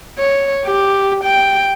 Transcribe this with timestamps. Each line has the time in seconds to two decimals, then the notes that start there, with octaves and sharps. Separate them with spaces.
0.18 C#5
0.66 G4
1.24 G5